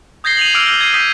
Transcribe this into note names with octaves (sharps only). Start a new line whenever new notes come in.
D#6 G6 G#6 A#6 C7 G7
D#7 F7 F#7
D6 E6 F6 D7 D#7
G6
G#6 C7 D#7
D#6 G6 B6 D#7